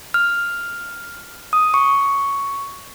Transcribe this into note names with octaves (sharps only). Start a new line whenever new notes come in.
F6
D#6
C#6